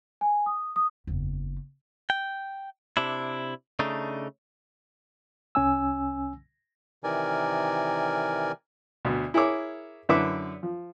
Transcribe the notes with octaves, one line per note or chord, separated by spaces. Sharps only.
G#5
D#6
D#6
F#1 E2
G5
C3 D4 E4
C#3 A3 D4 D#4
C2 C#4 G#5 E6
C3 D#3 E3 A#4 D5 G#5
D2 B2
E4 G#4 A#4 C#5 D6
F#2 D3 E4 B4 E5 D6
F3